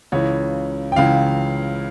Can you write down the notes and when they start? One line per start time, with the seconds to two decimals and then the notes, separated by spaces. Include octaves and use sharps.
0.12 C#2 C#3 E3 C#5
0.92 G5
0.96 C#2 C#3 E3 F5